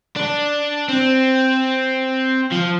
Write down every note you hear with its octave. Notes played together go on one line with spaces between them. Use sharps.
D4
C4
F3